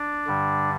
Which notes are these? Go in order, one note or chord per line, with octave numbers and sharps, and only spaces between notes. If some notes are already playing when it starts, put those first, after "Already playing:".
Already playing: D4 D5
G2 D3 G3